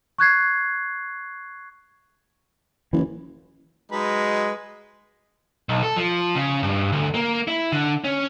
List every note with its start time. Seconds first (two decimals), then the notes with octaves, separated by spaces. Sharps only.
0.18 C#6 F#6 G#6 C7
2.93 F#1 E3
3.92 F#3 G#3 D#4 B4
5.69 B1
5.83 A4
5.96 F3
6.35 C#3
6.63 G2
6.92 D2
7.15 A#3
7.48 E4
7.72 D3
8.04 C#4